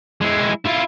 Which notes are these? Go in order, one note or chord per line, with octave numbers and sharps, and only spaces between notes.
G#3 E4
E4 F4